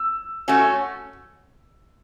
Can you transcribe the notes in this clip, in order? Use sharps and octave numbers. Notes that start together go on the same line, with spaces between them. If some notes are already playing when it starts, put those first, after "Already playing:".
Already playing: E6
A3 C#4 F#4